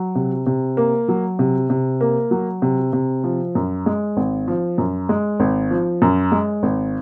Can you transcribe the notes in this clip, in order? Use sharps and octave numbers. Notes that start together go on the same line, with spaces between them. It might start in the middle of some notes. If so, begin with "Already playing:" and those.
Already playing: F#3
C3
C3
A#3
F#3
C3
C3
A#3
F#3
C3
C3
F3
F#2
G#3
G#1
F3
F#2
G#3
G#1
F3
F#2
G#3
G#1